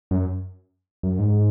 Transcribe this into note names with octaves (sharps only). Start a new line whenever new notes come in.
F#2
F#2
G#2